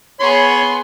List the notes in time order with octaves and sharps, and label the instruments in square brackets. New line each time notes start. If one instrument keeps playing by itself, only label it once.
[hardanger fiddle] B3 G#4 [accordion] C#5 [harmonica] C6